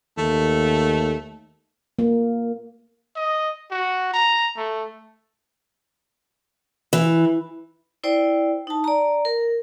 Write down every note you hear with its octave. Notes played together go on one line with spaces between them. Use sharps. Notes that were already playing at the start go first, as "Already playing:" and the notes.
D#2 A3
A#3
D#5
F#4
A#5
A3
E3
E4 C5 D5 G5
D#4 A5
D5 A#5
A#4